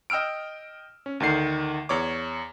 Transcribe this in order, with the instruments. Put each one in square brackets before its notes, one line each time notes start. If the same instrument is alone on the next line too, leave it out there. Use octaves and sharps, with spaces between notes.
[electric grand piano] D#5 G5 E6 F6 D7
C#4
D2 D3 D#3 C7
E2 C#5 D6